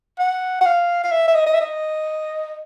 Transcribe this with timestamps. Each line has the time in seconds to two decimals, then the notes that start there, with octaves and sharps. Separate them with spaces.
0.19 F#5
0.61 F#5
0.66 F5
1.04 F5
1.11 E5
1.28 E5
1.35 D#5
1.46 D#5
1.54 E5
1.61 D#5